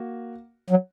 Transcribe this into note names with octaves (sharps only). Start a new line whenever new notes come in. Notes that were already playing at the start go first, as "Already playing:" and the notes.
Already playing: A#3 F#4
F#3